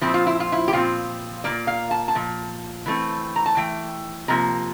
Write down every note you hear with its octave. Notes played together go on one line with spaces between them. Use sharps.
A#2 F3 C4 E4
F4
E4
F4
E4
G4
A#2 F3 C4 F4
A#2 F3 A#3 D5
F5
A5
A5
A#2 F3
E3 A3 C4
A#5
A5
E3 A3 G5
C3 F3 A#3 A#5